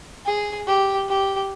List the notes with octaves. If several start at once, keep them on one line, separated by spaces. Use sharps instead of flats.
G#4
G4
G4